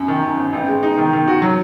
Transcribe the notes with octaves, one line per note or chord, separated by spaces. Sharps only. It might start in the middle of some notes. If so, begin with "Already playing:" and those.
Already playing: F#2
D#3
F#2
G#1
A1
G#3
D#4
D#3
D#3
F#4
F#3